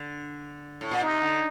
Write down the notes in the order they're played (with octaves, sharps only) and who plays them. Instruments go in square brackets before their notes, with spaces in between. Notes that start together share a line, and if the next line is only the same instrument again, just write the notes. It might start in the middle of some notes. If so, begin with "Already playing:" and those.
Already playing: [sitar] D3
A2
A#2
[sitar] C3 [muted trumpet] D#4
[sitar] D3